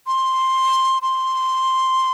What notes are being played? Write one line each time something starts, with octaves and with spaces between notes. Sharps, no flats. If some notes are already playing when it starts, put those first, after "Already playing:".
C6
C6